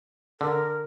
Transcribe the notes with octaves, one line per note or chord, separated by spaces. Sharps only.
D3 A#4